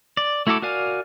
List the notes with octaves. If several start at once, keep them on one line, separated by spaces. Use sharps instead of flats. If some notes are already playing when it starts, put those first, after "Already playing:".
D5
A3 E4 F#4 A4 D6
F#4 A#4 D5 F5 G#5